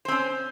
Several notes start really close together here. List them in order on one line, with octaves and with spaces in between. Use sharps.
C5 C4 C#4